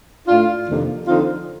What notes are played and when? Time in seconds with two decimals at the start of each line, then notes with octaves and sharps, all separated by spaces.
0.28 A2 A3 D4 F4
0.68 F2 C3 D#3 A#3 D4
1.07 D3 F3 C4 D#4 F4